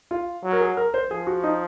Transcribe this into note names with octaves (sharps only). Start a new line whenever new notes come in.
F4
F#3
A#4
G#4
A#4
C5
F3 G#4
F#4
D#4